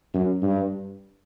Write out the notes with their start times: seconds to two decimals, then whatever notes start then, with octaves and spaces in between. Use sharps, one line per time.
0.14 F#2
0.42 G2